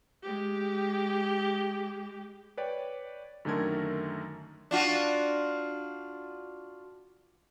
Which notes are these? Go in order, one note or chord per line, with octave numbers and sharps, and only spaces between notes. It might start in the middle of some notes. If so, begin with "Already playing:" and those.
G#3 G4
B4 C#5 D5 G5
F#2 D3 D#3 A3 A#4 G#6
D4 F4 F#4